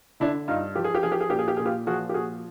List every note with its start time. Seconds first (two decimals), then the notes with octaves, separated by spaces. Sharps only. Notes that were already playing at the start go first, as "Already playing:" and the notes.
0.20 D3 D4 E4
0.48 G2 D#4 F4
0.75 F3 G4
0.84 G#4
0.95 G4
1.03 F3 G#4
1.12 G4
1.20 G#4
1.30 A#2 G4
1.39 G#4
1.48 G4
1.57 A#2 G#4
1.66 F4 G4
1.87 F3 F#4 G#4
2.09 G4
2.14 A#2 F#4 G#4